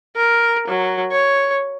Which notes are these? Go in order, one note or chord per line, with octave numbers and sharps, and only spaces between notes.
A#4
F#3
C#5